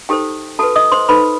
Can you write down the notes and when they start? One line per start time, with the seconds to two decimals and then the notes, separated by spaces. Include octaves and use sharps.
0.09 D#4 G4 A4 C5 G5
0.59 F#4 A4 B4 A5
0.75 D#5 D#6
0.92 C5 C6
1.09 D#4 A4 B4 C5 B5